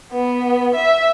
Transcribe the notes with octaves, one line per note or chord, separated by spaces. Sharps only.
B3
E5